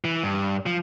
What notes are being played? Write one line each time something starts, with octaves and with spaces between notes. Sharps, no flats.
E3
G2
F3